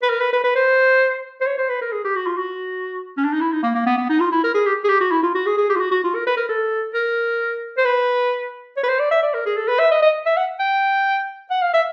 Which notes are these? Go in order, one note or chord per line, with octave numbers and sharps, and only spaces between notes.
B4
A#4
B4
B4
B4
C5
C5
C#5
C5
B4
A#4
G#4
G4
F#4
F4
F#4
C#4
D4
D#4
E4
D#4
A#3
A#3
B3
B3
D#4
F4
E4
A#4
G#4
G4
G#4
G4
F#4
E4
F4
F#4
G#4
G#4
G4
F4
F#4
F#4
F4
A#4
B4
A#4
A4
A#4
C5
B4
C#5
B4
C5
D5
E5
D5
A#4
G#4
A4
B4
E5
D#5
D#5
E5
F#5
G5
F#5
F5
E5